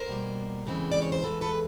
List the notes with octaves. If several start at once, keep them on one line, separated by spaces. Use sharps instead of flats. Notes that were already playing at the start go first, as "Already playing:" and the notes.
Already playing: A#4 C5
B2 G3 A#3
E2 C#3 E3 G#3 C4
D5
C#5
C5
E2 C#3 E3 G#3 A4 B4
A4 B4